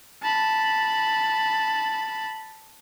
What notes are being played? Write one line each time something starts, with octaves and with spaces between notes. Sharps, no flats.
A5 B5